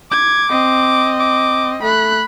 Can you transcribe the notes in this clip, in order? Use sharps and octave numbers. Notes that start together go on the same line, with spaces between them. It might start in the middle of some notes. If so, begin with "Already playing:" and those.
D6 G#6
C4 D#5
D6
A3 B5 F#6